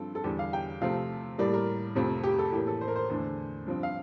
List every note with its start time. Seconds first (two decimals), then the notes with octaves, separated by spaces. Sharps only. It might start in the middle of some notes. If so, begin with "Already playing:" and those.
Already playing: G2 F3 C4 A4
0.15 A4
0.24 E2 D3 G3 G4
0.39 F5
0.53 G5
0.81 C3 F3 A3 C4 F5
1.38 A2 G3 A#3 D5
1.53 A#4
1.95 F2 C3 F3 A3 C4
2.23 G4
2.38 A4
2.52 A2 E3 A#3 G4
2.67 A4
2.81 C5
2.88 A#4
2.96 C5
3.09 E2 D3 A3
3.66 G2 F3 C4
3.83 F5